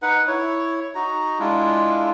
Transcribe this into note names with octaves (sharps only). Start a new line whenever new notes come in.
D#4 B4 F#5
E4 C#5
D#4 F#4 A#5
G#3 D4 E4 F4